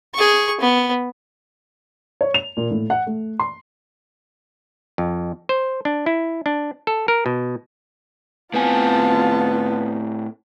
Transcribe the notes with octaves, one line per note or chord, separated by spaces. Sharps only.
G#4 C#6
B3
C#5
F7
A#2
A2
F#5
A3
C6
F2
C5
D4
E4
D4
A4
A#4
B2
A2 B3 C4 F4 G#5 A5